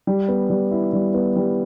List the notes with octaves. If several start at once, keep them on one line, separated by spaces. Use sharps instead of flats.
G3
B3
G3
E4
G3
B3
G3